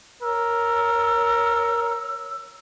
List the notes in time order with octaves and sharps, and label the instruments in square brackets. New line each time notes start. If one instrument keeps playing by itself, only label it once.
[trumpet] A#4 [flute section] C#5 E6